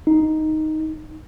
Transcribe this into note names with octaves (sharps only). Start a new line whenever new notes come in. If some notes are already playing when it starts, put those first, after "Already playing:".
D#4